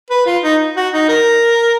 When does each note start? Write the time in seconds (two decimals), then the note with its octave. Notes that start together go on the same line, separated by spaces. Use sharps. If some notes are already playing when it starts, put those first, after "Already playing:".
0.10 B4
0.26 F4
0.44 D#4
0.77 F#4
0.93 D#4
1.09 A#4